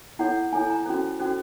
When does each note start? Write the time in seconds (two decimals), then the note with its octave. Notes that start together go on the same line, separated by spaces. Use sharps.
0.19 E4 A4 C#5 F#5
0.53 E4 A4 C#5 G#5
0.70 A#5
0.86 C#4 F#4 A4 C5
1.19 C#4 F#4 A4 C5